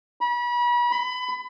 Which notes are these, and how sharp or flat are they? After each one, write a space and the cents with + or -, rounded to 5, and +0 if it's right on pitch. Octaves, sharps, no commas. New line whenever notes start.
B5 -35
B5 +30